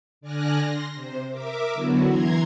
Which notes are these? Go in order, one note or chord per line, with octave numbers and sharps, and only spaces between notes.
D3 D5 G#5 F6 F#6 A#6
C6 A#6
C3 C5
A#4 E5 D6
D3 F#3 B3 E4 F#4
E3 A#5 C6 G#6